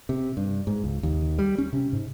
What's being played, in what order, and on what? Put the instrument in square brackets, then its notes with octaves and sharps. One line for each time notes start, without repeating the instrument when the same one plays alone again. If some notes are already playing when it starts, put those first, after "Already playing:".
[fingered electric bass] C3
G2
G#2
C#2
D#2
G3
C#4
C3
G#2